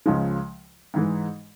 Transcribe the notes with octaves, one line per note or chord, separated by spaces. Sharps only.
C#2 C#3 F3 G#3
G#2 E3 G#3